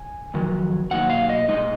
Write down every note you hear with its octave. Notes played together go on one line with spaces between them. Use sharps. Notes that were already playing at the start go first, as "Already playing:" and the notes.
Already playing: G#5
F2 D#3 F#3
B2 F#3 A#3 D#4 F#5
F5
D#5
A#2 G#3 D#4 D#5